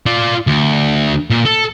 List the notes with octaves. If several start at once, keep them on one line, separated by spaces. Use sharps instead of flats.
F4 D5
D2
A#2
A4